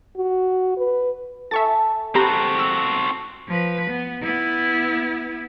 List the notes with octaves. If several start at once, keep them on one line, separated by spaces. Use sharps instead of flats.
F#4
B4
A4 E5 G#5 A5 C#6 A6
C4 F#4 G4 A#5 B5
E6
F3 B4
B3
B3 E4